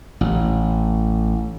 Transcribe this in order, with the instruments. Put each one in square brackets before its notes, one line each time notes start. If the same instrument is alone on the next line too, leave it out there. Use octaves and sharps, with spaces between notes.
[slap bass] A1